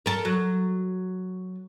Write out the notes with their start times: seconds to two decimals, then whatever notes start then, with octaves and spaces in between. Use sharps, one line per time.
0.06 A4 A#4
0.25 F#3